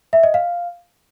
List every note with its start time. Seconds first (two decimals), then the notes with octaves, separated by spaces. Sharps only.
0.13 E5
0.23 D#5
0.34 F5